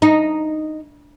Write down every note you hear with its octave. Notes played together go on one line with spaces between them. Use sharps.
D#4